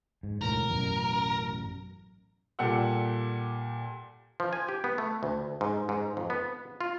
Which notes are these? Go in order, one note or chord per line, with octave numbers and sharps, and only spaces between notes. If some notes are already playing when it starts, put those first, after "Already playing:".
G#2
E1 D2 A2 A#4
A1 F#2 B2
A#2 G3 G4 A4 F#5 E6
F3
G#5
G4
B3
A3
D2
G#2
G#2
F2
B3
F4